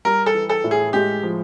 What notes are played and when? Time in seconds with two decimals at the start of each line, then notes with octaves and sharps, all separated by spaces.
0.05 G3 A#4
0.26 A4
0.34 E3
0.49 A4
0.64 A2
0.71 G#4
0.93 G#3 G4
1.23 F3